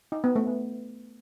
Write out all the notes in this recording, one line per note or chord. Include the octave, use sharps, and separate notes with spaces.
D#4
B3
A3
B3